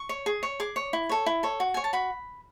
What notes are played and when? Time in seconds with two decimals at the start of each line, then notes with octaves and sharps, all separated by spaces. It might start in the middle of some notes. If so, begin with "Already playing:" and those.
Already playing: C#6
0.09 C#5
0.26 G#4
0.43 C#5
0.60 G#4 D6
0.76 C#5
0.93 E4
1.09 A4 C#5
1.26 E4
1.43 A4 C#5
1.60 F#4
1.74 C#5 G#5
1.84 A5
1.93 F#4 B5